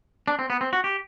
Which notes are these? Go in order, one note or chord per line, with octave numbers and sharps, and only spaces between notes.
D4
C4
B3
C4
F#4
G4